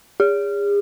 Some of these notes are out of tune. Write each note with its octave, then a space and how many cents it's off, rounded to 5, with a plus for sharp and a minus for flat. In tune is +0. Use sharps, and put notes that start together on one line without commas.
G#4 -40